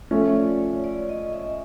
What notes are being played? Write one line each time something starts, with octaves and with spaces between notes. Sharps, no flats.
F3 A3 C#4
C#5
D5
C#5
D5
D#5
E5